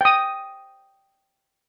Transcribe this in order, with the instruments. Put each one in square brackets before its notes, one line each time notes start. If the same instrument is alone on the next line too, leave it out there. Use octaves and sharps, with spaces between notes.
[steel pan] G5 D#6